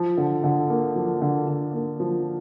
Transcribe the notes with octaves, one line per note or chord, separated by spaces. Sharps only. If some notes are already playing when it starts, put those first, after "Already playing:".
Already playing: F3
D3
D3
A#3
F3
D3
D3
A#3
F3